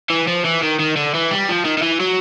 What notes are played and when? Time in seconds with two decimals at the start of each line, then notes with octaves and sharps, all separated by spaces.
0.10 E3
0.27 F3
0.45 E3
0.62 D#3
0.79 D#3
0.96 D3
1.14 E3
1.31 G3
1.49 F3
1.65 D#3
1.78 D#3
1.83 E3
2.00 F#3